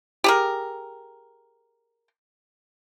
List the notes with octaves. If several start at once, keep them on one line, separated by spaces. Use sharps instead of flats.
G4 G#4 A#4